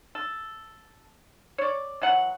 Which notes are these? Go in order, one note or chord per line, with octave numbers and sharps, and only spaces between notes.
A4
C#5 D5
E3 F#3 F#5